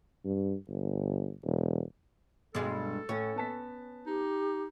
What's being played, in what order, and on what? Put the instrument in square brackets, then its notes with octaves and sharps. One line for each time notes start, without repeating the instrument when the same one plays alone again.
[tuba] G2
G1
E1
[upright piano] B1 [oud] G2 G#3 [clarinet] A4
[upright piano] A2 [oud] C#4
[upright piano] B3 A5 B6
[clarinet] D#4 [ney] G4